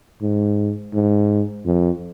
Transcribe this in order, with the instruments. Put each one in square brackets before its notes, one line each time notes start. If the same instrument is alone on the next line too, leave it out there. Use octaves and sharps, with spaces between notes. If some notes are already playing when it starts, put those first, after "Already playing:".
[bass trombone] G#2
G#2
F2